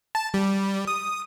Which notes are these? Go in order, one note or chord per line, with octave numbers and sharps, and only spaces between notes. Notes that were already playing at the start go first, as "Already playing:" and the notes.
A5
G3
D#6